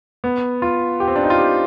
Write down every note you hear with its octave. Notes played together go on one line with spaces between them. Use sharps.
B3
F4
G4
C4
D4
D#4
F4
G4